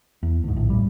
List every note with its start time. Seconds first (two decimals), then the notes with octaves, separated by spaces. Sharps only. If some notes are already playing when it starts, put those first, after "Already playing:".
0.23 E2
0.44 D2 G#2
0.56 A#1 A2
0.70 A2 G3